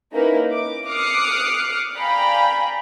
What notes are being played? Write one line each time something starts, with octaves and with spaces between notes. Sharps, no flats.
A#3 C#4 D#4 E4 A#4 B4
D6
D6 D#6 F6 F#6 C7 C#7
D5 F5 G5 G#5 A#5 B5